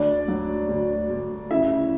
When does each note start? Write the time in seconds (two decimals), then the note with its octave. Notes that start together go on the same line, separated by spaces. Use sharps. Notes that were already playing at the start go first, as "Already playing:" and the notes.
Already playing: D2 D4 D5
0.28 F#3
0.69 D2
1.10 D2
1.51 C#3 E4 E5